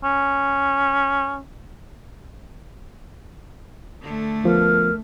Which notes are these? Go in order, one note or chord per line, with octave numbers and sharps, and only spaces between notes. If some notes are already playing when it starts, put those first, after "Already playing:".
C#4
D3 A3
D2 F3 B3 A#4